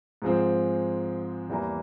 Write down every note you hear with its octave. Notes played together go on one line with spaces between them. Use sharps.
G#2 F3 G#3 C4
E2 E3 G3 A#3